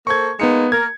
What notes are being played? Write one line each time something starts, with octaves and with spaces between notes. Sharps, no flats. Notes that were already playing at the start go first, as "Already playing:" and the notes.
A#3 A4 C5 C#6 G#6
G#3 A#3 B3 D#4 C#7
A#3 A#4 G#6